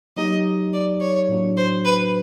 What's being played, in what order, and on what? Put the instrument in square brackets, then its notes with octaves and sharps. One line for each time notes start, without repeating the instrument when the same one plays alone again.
[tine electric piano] F#3 A#3 D#4 G4 [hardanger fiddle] D#5
[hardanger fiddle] D5
C#5
[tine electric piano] A2 F#3 A#3 D4 F#4
[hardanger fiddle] C5
B4